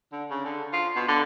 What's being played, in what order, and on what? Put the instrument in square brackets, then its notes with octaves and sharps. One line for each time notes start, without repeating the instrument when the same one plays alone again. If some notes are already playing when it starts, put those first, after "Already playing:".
[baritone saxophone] D3
C#3
D3
F4
B2
D3